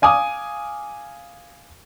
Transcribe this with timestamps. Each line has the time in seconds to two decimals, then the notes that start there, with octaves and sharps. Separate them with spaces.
0.02 F5 G#5 D6 D#6